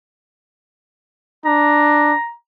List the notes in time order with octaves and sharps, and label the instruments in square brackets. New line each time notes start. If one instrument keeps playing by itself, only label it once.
[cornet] D4 [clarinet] A#5